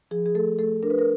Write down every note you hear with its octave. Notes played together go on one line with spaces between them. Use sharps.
F3 G#4
G#4
A3 A4
A3 A4
D4 A#4
B4
A#4